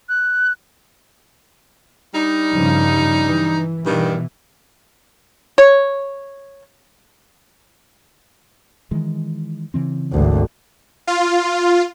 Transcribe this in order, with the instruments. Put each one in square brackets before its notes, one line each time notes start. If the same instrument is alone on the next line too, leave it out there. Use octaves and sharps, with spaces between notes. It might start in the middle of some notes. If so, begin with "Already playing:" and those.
[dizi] F#6
[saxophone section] G3 D4 D#4
[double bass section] G2 C#3 F3
E3
[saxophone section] G2 D#3 [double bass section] B2 E3
[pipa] C#5
[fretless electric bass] D#3 E3 G#3
C#3 E3 C4
[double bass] G#1 D2
[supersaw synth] F4